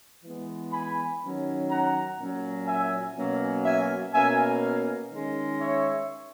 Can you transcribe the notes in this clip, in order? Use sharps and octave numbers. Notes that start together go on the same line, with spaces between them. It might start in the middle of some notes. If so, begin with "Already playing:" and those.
E3 G#3 B3
G#5 B5
D#3 F#3 C#4
F#5 A#5
A#2 F#3 C#4
E5 G#5
B2 F#3 A#3 C#4
E5 G#5
B2 A#3 C#4 E5 G#5
D#3 G#3 C#4
C#5 E5